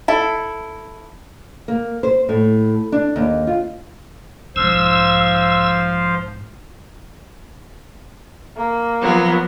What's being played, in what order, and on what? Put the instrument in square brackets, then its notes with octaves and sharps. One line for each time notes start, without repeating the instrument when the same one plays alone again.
[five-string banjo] E4 A4
[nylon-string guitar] A#3
C5
A2
D4
D#2
F4
[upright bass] B1 G#2 [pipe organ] F3 C5 F5 [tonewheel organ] E6
[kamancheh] A#3
[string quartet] F3 F#3 B3